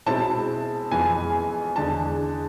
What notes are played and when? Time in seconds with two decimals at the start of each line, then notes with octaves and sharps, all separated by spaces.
0.06 B2 G#3 C4 E4 A5
0.91 F2 E3 G#3 B3 G#5
1.76 E2 D3 G#3 A5